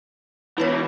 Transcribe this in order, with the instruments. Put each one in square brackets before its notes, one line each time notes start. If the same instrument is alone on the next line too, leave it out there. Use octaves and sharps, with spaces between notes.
[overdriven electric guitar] B2 E3 [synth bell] E4 B4 C#5